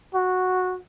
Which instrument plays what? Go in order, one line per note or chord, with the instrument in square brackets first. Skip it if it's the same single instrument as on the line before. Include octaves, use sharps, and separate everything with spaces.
[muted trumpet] F#4